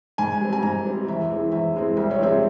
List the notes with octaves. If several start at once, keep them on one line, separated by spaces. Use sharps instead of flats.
G#2 G#5
G3 C4
G#5
G#2 A#5
G3 C4
E2 E5
E3 G#3 C4
E2 E5
E3 G#3 C4
C2 E5
C#5
C3 F3 G#3 C4 E5